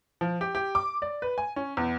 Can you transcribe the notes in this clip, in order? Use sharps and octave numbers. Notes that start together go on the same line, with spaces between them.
F3
G4
G4
D6
D5
B4
G#5
C#4
E2